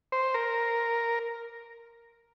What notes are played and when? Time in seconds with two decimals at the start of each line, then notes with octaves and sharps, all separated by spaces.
0.12 C5
0.34 A#4